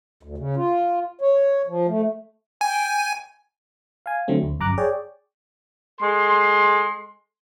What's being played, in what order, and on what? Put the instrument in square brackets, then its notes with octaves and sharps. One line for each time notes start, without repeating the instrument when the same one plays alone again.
[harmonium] D2
C#3
F4
C#5
F3
A3
[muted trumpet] G5 [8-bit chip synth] G#5
[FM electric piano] F5 G#5
D3 F#3 A3 C4
D2
G1 F#2 A#5 D6 F#6
G#4 C#5 D5 G5
[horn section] G#3 A4 C6